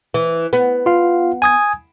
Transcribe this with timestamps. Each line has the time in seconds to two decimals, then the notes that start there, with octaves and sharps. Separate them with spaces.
0.14 E3
0.53 B3
0.86 F4 F5
1.42 G#5 D#6 G#6